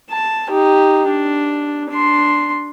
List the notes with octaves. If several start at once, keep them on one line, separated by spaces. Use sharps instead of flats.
A5
D#4 G4
D4
D4 C6